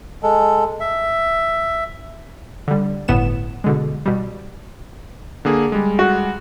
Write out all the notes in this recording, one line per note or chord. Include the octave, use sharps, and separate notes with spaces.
G#3 A4
E5
D3 G3
G1 A2 B3 E7
B2 D3 G#3
B2 G3
D3 A#3 G#4
G3 G#3
F#4